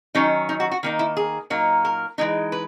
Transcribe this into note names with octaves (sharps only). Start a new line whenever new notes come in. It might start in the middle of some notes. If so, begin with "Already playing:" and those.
D#3 F#3 C#4 D#4
D#4
F#4
F#4
D#3 A#3 D#4
E4
G#4
A#2 F#3 A#3 D#4
A#4
E3 G#3 D#4
B4